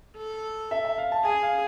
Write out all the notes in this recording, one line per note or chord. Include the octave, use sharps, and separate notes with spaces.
A4
E5
E5
F5
A5
G#4 G#5
F5